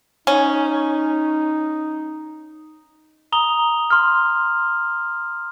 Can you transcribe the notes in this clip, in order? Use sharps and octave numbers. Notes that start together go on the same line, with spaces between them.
C#4 D#4
A#5 D#6 F7 G7
C6 F6